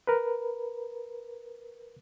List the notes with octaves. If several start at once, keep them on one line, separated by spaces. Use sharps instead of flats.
A#4 B4